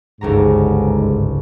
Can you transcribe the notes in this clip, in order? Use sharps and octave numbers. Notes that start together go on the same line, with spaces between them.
G1 C#2 G#2 A#5